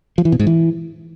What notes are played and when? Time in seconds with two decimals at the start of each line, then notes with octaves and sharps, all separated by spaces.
0.18 F3
0.25 E3
0.32 B2
0.40 G#2
0.47 E3